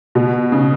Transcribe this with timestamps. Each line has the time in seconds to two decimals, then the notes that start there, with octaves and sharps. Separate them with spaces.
0.15 B2
0.52 C#3